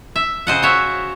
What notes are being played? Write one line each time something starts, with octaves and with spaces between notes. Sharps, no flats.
E5
C#3 C5 D#5 F#5
F#4 C#5 E5